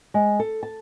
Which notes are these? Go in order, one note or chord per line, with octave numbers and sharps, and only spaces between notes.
G#3
A4
A5